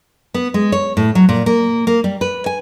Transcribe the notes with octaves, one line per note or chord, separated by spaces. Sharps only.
B3
G#3
C#5
A2
F#3
A#2
A#3
A#3
G3
B4
G#5